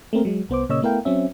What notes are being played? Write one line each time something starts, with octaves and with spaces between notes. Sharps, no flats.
A3 A#3 C4 A#4
F#3 G#3
C2 B3 C5 D6
A#2 C#3 A#3 C#5 D#5 E6
A3 B3 E4 A#4 F5 G5
F#3 C4 C#4 E5